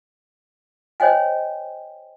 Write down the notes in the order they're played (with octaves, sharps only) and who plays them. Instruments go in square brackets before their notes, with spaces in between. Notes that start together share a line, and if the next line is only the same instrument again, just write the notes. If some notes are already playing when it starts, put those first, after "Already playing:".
[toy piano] C5 C#5 D#5 G5 G#5